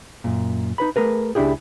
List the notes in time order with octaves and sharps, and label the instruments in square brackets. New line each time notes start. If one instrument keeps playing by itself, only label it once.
[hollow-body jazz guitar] F#2 A#2
D#4 B4 B5
A3 G#4 A#4 B4
C#2 D4 E4 G4 G#4